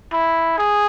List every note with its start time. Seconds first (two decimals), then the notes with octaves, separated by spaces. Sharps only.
0.13 E4
0.58 G#4